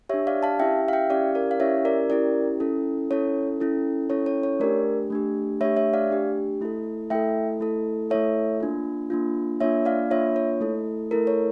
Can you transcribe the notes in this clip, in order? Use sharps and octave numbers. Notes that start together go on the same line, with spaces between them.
D4 G4 C#5 E5
D5 F5
F5 A5
C#4 E4 G4 E5 G5
F5
E5 G5
C#4 E4 G4 D5 F5
A#4 D5
F5
C#4 E4 G4 C#5 E5
A#4 D5
C#4 E4 G4 A#4 D5
C#4 E4 A4
C#4 E4 A4 C#5
C#4 E4 A4
C#4 E4 A4 C#5
C#5
C#5
A3 D4 G4 A#4 D5
A3 D4 G4
A3 D4 G4 C#5 E5
C#5 E5
D5 F5
A3 D4 G4
A3 E4 A4
A3 E4 A4 E5 G5
A3 E4 A4
A3 E4 A4 C#5 E5
A#3 D4 F4
A#3 D4 F4
A#3 D4 F4 C#5 E5
D5 F5
A#3 D4 F4 C#5 E5
C#5
A3 E4 A4
A3 E4 A4 A#4
C#5